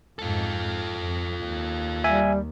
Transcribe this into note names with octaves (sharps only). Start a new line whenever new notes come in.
F2 G#2 F4 A4
F2
D#2
G3 E5 G#5